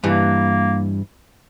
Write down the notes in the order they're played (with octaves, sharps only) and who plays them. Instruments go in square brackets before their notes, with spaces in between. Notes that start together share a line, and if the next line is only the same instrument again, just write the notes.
[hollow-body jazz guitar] G2 E3 [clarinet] A#3